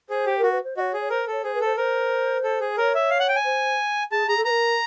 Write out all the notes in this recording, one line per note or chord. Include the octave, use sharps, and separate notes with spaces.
G#4 C5
G4
F#4 A#4
B4
C5
F#4 C#5 D#5
G#4
C#5
A#4 C5
A4 C#5
G#4 C5
B4
A4 C5
A#4 C5
A4
G#4
A#4 C#5
E5
F5
F#5
G5
G#5
C5
G#4 A5
G#4 A#5
A4
B4 A#5
A#4